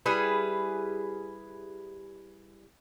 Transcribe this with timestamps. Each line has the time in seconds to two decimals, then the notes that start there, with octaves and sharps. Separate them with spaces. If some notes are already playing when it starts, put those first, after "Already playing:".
0.06 G3 E4 G#4 B4